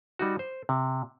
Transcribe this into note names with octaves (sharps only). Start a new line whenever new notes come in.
G3 D#4 F#4
C5
C3